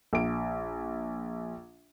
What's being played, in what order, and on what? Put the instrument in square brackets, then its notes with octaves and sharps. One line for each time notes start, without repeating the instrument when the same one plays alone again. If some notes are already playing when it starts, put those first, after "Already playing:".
[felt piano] A#1 D7